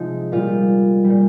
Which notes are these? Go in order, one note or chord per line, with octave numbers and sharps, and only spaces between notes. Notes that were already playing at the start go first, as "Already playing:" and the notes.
Already playing: C3 F3 G#3 D#4
A#2 G3 F4
G3
A#2